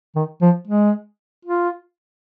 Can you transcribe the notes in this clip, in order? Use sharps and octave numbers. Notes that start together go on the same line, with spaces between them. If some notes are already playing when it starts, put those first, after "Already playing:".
D#3
F3
G#3
F4